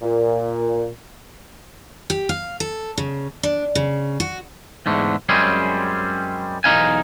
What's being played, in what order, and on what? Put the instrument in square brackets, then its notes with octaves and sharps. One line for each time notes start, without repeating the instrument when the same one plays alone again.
[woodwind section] A#2
[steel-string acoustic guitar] G4
F5
A4
C#3
D4
C#3
F#4
[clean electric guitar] E2 G#2 D3 A3
F#2 G3 G#3 C4 C#4 G#4
B1 E2 D#4 F5 G#5